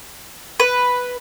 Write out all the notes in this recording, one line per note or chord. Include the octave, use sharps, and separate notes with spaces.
B4